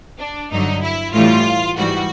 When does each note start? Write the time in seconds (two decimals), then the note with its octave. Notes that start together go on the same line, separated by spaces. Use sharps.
0.18 D4
0.50 G2 D3 F#3 D#4
0.82 E4
1.13 A2 E3 G3 F4
1.76 G#2 E3 G3 F#4